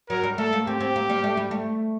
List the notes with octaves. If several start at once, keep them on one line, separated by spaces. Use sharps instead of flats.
F#3 A#4
G3
A3 A4
A#3
C4 G4
C4
A#3
G3
A3
G3
A3